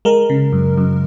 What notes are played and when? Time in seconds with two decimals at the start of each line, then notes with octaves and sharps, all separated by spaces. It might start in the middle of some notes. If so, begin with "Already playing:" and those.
0.05 G#3 A#4
0.30 C#3
0.53 F#2
0.78 F#2